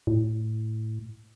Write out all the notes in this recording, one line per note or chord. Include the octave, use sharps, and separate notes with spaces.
A2